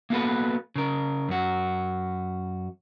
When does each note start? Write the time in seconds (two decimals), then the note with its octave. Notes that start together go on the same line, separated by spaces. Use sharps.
0.10 A#3 B3 F#4 G#4 A4 B4
0.76 C#3 A#4
1.29 F#2 F#4